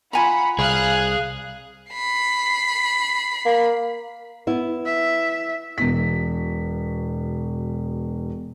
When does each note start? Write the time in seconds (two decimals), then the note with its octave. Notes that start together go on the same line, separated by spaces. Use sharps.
0.13 F4 F#5 G#5 A#5 B5
0.59 C2 G#4 F5 F#6
1.93 B5 C7
3.46 A#3
4.47 B3 E4
4.85 E5
5.78 E1 B2 B6